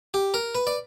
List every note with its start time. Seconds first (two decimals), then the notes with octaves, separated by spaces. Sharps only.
0.14 G4
0.34 A#4
0.55 B4
0.67 D5